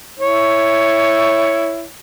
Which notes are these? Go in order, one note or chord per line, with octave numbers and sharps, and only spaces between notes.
E4 C#5